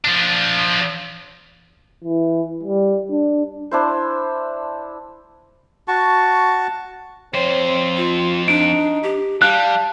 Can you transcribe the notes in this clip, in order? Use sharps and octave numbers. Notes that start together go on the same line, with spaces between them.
F3 D4
E3
G3
D4
D4 E4 C5
F#4 A5 C#6
F2 C4 C5 C#5
F4
D4 D#4 D7
G4
G3 F5 A5 F#6